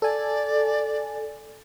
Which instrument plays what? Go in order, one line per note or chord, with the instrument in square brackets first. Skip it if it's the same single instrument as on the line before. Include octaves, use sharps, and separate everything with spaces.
[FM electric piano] A4 G#5 [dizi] D5